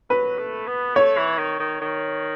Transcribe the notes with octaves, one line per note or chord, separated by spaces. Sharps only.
F#3 B4
A3
B3
A3 C#5
E3
D#3
D#3
D#3